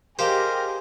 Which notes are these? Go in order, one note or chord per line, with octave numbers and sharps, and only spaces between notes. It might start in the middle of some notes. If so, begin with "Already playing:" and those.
G4 G#4 A#4 C5 D#5 F5